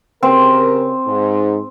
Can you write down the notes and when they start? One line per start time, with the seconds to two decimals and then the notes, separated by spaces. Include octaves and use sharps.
0.23 C#3 C4 G4 A#4
1.07 G#2